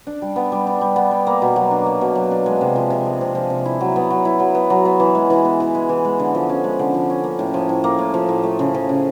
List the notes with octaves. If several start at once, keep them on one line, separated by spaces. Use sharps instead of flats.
D4
G3
B3
G3
D4
G3
B3
G3
A#3
B2
F#3
D4
A#3
B2
F#3
D4
G#3
C3
F3
C3
G#3
C3
F3
C3
E4
F#3
B3
F#3
E4
F#3
B3
F#3
B3
E3
G#3
E3
B3
E3
G#3
E3
G#3
D3
F3
C#4
G#3
D3
F3
C#4
A#3
A2
F3
A2
A#3
A2
F3
A2
A3
C#3
F3
C#3